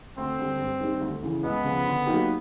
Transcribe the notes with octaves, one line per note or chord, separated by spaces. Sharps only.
D2 C4
D3 G3
G2
D#3 G3
D2
C#3 E3
C#2 B3
C#3 F3
D3
F#3 A#3 D#4 G4